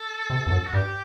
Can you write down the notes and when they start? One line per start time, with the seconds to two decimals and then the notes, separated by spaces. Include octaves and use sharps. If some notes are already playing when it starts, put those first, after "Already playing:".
Already playing: A4
0.30 C3
0.47 E2
0.51 F#2
0.65 F#4
0.73 G2 G4